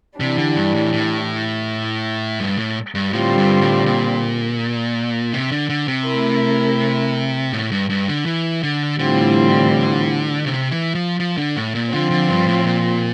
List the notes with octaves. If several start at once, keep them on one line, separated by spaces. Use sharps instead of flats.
C3 E3 G3 D4
D3
G2
A2
A2
G2
A2
G2
A2 D3 G3 C4 F4
G2
A2
A#2
C3
D3
D3
C3
A3 E4 A#4
A2
G2
G2
D3
E3
D3
A2 D3 E3 G3 C4 F4
C3
E3
F3
F3
D3
A2
A#2
D3 F3 C4 F4
D3
G2
A2
A#2